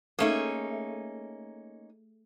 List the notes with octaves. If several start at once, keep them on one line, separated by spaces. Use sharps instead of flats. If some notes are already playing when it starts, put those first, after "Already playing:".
A3 A#3 C#4 D#4 G#4